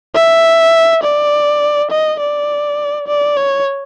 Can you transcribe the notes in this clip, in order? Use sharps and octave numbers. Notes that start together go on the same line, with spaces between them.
E5
D5
D#5
D5
D5
C#5